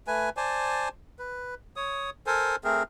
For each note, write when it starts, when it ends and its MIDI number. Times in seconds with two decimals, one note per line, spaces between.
0.07 0.30 57
0.07 0.30 71
0.07 0.30 80
0.37 0.89 72
0.37 0.89 74
0.37 0.89 80
0.37 0.89 81
1.19 1.55 71
1.76 2.10 73
1.76 2.10 87
2.27 2.56 69
2.27 2.56 70
2.27 2.56 72
2.27 2.56 80
2.64 2.83 57
2.64 2.83 60
2.64 2.83 68
2.64 2.83 70